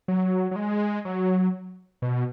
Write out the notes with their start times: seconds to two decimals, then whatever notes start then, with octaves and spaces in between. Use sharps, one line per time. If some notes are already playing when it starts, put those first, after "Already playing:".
0.08 F#3
0.51 F#3
0.56 G#3
1.05 F#3
2.02 B2